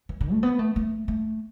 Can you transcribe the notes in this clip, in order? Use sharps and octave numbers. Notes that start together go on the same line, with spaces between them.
E3
D3
A3
B3
A3
A3
A3